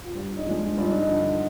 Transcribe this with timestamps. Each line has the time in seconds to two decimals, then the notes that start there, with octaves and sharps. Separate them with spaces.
0.04 F4
0.15 G2 G4
0.37 D#4
0.46 F3 G#3 D4
0.77 G2 F4
0.84 D#4
0.92 D4
0.98 D#4
1.09 D3 F3